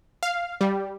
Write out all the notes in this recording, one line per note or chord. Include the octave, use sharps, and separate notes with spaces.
F5
G3